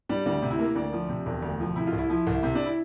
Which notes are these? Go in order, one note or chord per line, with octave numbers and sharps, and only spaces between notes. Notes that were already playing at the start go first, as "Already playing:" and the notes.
G3 D4
D2 D4
C3
E4
A#3
D2 D4
F3
C3
E1
D2
F3
C3 E4
F4
C2
E4
F3
C2
C3
D4
E4